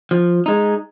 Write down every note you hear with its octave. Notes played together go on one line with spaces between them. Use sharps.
F3
G#3 D#4